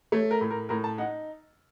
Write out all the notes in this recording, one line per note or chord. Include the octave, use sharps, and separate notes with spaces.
A3 C#5
A#4
A2
A#4
A2 A#4
A5
D#4 F#5